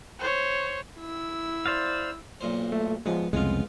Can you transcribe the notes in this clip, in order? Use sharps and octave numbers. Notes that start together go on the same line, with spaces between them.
C5 C#5
E4 E6
C5 D5 F5
B1 A#2 C5
A3
F3 G#3 B3
C2 F2 C#3 G#3 B3 F4